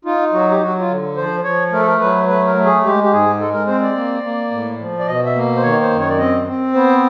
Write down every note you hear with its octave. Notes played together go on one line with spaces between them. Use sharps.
D#4 F4
F#3 F#4
G4
F#3 F#4
F4
D3
F3 C5
F3 C#5
A3 A#4
A4
A#4
F#3 B4
A3 B4
A#4
A3
G#4
G#3 G4
G4
G#2 G#4
G#3 A4
A#4
C4 C5
D5
A#3
A#3
A2
F3
D5
B2 D#5
E5
A#3
C5
D#3 C#5
C5
F#2
C#5
D5
C4 D#5
C4
B3 C5